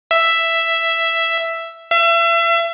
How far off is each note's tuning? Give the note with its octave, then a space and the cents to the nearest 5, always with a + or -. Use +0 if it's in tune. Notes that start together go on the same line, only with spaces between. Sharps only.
E5 +5
E5 +35